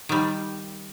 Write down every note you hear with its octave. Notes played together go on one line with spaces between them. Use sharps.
D#3 G3